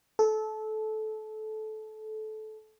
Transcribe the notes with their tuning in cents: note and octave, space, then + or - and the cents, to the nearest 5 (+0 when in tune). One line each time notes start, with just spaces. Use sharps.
A4 -20